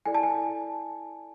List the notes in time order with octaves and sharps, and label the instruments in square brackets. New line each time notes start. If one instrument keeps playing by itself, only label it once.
[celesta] E4 A4 D5 G#5
A5
G#5